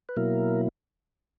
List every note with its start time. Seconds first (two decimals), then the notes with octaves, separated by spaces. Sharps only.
0.09 B4
0.16 B2 F#3 A#3 E4 A#4